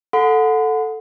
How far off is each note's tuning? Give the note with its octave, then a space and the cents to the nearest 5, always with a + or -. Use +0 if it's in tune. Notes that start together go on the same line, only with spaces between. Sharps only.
A4 +0 F#5 -20 B5 +45